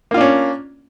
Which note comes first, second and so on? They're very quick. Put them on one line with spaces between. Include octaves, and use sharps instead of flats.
A#3 F4 D4 C#4